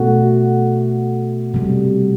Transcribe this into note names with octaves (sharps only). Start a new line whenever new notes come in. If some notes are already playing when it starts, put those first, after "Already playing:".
Already playing: B2 A3 F#4
C3 G3